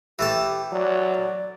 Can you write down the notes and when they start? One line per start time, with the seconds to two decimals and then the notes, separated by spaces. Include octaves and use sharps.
0.19 E3 A3 G4 A5
0.72 F#3 D5